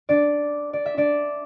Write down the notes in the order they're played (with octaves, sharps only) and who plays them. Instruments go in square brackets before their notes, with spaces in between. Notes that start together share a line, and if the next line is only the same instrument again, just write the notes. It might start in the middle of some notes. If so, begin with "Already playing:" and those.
[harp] D4 D5
D5
E5
D4 D5